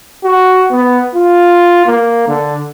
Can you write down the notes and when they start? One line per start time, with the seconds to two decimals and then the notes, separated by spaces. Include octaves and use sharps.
0.24 F#4
0.71 B3
1.15 F4
1.86 A#3
2.28 D3